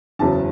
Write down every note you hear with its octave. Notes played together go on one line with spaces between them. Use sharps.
F#1 E2 C#3 F#3 A5